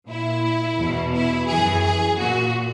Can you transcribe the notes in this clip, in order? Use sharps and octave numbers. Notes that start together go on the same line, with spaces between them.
A#2 E4
E2 B2
E4
F#2 E3 G#4
G#4
A#2 F#4